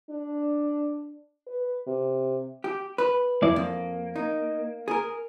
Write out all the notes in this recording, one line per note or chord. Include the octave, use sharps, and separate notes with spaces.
D4
B4
C3
G4
B4
F2 E4 D5
F2 A#3
D#4
G#4 A#4